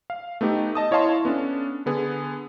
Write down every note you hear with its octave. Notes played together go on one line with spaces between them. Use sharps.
F5
A3 B3 D#4 G4
D#5 A5 D#6
E4 C#5 D#5 F5 A5 C6
B3 C#4 D4 A4
D3 B3 G#4